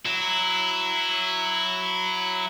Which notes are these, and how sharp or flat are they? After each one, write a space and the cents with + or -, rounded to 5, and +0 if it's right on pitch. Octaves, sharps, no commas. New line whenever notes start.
F#3 +0 E4 +0